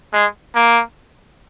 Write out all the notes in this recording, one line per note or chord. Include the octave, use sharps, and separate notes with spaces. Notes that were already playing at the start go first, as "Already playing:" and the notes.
G#3
A#3